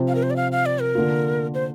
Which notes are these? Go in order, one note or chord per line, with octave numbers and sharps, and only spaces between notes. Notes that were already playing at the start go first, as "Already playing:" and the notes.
Already playing: C3 F3 C4
F5
A#4
C5
D5
F5
F5
D5
A#4
D3 A#3 F4
C5